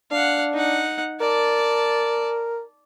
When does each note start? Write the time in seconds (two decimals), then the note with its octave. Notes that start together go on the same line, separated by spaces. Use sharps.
0.11 D4 F5 F#5
0.54 D#4 F#5
1.20 A#4 D5 A5